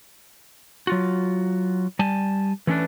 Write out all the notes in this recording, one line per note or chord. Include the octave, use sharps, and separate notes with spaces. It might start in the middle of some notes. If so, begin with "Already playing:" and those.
F#3 F4 F#4
G3 G#5 A5
E3 A3 C#4 D4 B4